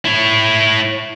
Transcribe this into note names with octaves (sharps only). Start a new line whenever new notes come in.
E4 C#5